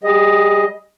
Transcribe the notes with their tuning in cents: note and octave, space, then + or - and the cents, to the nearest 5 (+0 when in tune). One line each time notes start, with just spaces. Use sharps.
G3 +0 G#4 -30 D#5 +5